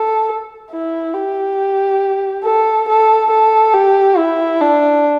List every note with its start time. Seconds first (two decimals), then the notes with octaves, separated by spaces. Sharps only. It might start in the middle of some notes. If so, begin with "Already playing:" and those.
Already playing: A4
0.71 E4
1.14 G4
2.44 A4
2.88 A4
3.30 A4
3.74 G4
4.17 E4
4.61 D4